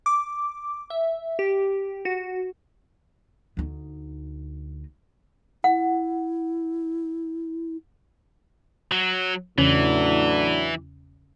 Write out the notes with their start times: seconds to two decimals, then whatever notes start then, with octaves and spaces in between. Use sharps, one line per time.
0.06 D6
0.90 E5
1.39 G4
2.05 F#4
3.57 D2 D#4
5.64 E4 F#5
8.92 F#3
9.58 E2 A2 C#3 E3 F#3 C#4 D4